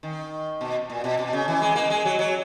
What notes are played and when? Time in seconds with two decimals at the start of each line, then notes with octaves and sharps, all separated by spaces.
0.03 D#3
0.61 B2
0.90 A#2
1.04 B2
1.19 B2
1.33 C#3
1.48 E3
1.61 G#3
1.76 A#3
1.90 G#3
2.05 F#3
2.19 F#3